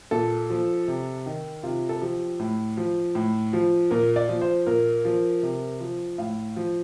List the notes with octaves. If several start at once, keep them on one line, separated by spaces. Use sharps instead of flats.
A#2 A4
F3
C3
D#3
C3 F4
A4
F3 G4
A2
F3
A2
F3
A#2 A#4
D5
F3
C5
A#2 A#4
F3
C3
F3
A2 F5
F3